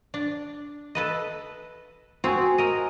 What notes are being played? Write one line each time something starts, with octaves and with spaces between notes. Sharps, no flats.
D4
A4 B4 D#5
C4 F#4 G#4 C#5 G#5
A#4 D#5